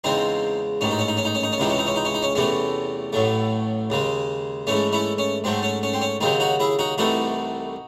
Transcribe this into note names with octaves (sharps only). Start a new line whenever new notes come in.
E2 C#3 G#3 C4 D#4
A1 G#2 D#3 C#4
D#4
C#4
D#4
C#4
D#4
C#4
D#4
C#4
C#2 C3 E3 G#3 D#4
C#4
D#4
C#4
D#4
C#4
D#4
C#4
E2 C3 E3 A3 C#4
A1 A2 F#3 A3
D#2 C#3 G#3
G#2 E3 A3 C#4
C#4 E4
C#4
G#2 F#3 A3 C4
C#4
C#4
C4
C#4
D#2 C#3 F#3 C4 D#4
D#4 F#4
E4 G#4
D#4 F#4
C2 C3 E3 A3 D#4 F#4